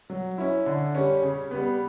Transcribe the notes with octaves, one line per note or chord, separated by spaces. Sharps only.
F#3
C#4 E4
D3
G3 C#4
C#3
G3 B3